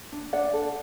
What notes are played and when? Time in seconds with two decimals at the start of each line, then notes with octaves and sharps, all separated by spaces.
0.12 D4
0.33 D4 D5 F#5
0.53 A4